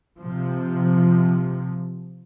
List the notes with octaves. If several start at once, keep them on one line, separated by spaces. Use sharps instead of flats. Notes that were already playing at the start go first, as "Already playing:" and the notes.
C3 F3